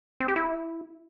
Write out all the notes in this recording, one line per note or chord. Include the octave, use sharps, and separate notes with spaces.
C4
G4
E4